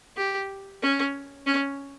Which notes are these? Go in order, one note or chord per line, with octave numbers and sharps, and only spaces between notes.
G4
C#4
C#4